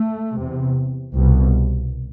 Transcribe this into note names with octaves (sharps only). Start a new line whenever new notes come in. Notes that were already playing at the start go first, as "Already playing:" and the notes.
Already playing: A3
E2 C3
C2 B2